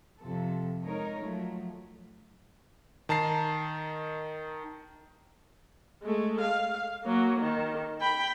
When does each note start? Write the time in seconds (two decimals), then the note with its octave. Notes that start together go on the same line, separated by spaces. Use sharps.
0.21 F2 C3 F3 A4
0.83 G#3 D#4 A#4 C#5
1.22 F3 F#3 A3
3.09 D#3 A5 A#5 C7
6.03 G#3 A3
6.41 F5
7.04 F#3 A#3
7.39 D#3
8.01 G5 B5